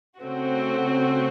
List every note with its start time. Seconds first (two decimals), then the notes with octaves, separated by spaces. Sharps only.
0.19 C#3 A3 C4 F#4